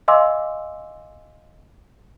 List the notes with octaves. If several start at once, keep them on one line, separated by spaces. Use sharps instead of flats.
D#5 F5 G#5 C6 D6 E6